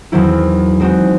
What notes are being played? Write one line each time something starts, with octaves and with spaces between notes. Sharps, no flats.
E2 D#3 F#3 C4 E4
G#3 C4 D#4 F#4